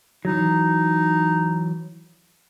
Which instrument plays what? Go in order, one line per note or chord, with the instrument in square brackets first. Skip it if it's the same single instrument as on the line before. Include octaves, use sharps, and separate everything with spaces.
[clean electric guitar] E3 F#3 [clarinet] D#4